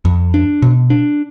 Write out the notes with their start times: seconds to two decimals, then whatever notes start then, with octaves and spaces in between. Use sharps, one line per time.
0.05 F2
0.34 D4
0.62 B2
0.90 D4